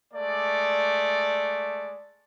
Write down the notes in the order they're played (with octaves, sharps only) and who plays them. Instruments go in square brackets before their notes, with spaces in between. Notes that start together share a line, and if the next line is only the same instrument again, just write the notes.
[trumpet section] G#3 A3 D5